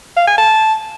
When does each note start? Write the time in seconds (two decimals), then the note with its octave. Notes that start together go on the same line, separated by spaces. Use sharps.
0.17 F5
0.27 G#5
0.38 A5